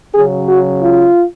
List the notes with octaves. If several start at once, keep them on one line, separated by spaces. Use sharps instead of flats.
C#3 F#3 C#4 G#4
F#4
F4